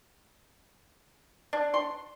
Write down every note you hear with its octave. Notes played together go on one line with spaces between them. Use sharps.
D4
C6